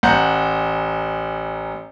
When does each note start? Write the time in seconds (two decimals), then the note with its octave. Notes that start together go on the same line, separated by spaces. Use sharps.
0.03 A1 F#5 A#5 G6 C#7